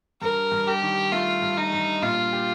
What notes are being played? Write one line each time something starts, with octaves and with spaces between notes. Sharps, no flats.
G2 A#4
G2
G4
D#3
A3 F4
G2
D#4
G2
A#2 F4
G4